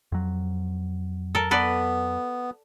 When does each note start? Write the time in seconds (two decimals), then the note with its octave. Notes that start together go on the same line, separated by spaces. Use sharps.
0.12 F2 F#3
1.35 A4 A#4
1.51 B3 A4 B4 D5